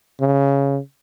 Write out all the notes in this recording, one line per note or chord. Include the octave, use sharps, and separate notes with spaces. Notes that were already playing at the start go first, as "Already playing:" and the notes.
C#3